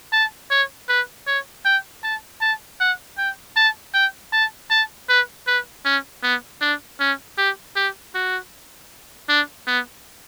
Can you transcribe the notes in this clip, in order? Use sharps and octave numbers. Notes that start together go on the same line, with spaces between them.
A5
C#5
B4
C#5
G5
A5
A5
F#5
G5
A5
G5
A5
A5
B4
B4
C#4
B3
D4
C#4
G4
G4
F#4
D4
B3